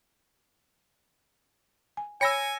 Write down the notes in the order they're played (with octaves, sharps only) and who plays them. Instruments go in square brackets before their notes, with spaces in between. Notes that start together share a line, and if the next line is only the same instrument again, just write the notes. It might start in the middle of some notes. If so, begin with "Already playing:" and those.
[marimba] G#5
[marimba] C#5 B5 [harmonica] G#5 [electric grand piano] E6 A#6 C#7